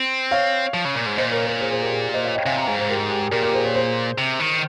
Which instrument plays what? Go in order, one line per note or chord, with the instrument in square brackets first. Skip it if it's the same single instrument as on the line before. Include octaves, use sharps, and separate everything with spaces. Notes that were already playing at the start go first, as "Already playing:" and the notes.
Already playing: [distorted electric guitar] C4
[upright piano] C#5 F5
[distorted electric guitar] F3
C#3
A#2
G#2
[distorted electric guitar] A#2 [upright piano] C5 D#5
[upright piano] A#4 C#5
A#4 C#5
G#4 C5
G#4 C5
G4 A#4
G#4
G4
C5 D#5
C#5 F5
D#5 G5
[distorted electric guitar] C3 [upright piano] F5 G#5
[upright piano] G5 A#5
[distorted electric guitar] G#2 [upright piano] F5 G#5
[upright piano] G#4 C5
G4 A#4
G#4
G4
G#4
[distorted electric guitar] A#2 [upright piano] G4 A#4
[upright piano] G4 A#4
G#4 C5
A#4 C#5
G#4 C5
[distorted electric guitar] C3
D#3